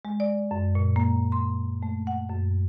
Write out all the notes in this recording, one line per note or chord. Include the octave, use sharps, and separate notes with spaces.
G#3
D5
F#2
A#2
A#3
C6
A3
F#5
F#2